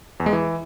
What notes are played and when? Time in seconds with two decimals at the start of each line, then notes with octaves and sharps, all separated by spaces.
0.20 E2
0.26 G#3
0.33 E3